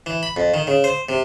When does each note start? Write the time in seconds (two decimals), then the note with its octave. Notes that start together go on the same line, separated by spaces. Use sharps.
0.06 E3
0.23 B5
0.37 F2
0.54 D#3
0.67 C#3
0.84 C5
1.09 C3